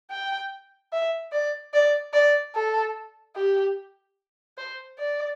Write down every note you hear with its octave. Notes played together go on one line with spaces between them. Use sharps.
G5
E5
D5
D5
D5
A4
G4
C5
D5